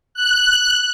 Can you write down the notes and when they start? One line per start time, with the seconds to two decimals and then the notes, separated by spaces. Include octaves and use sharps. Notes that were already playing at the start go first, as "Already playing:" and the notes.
0.14 F#6